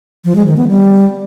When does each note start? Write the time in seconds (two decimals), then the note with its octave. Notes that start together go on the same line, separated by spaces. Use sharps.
0.25 F3
0.35 G#3
0.46 D#3
0.57 B3
0.68 G3